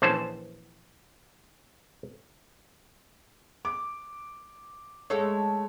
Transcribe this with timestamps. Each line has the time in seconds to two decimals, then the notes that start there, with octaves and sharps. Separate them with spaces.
0.02 A#1 E3 C#4 C5 A5
3.65 D6
5.10 G#3 A3 A4 C#5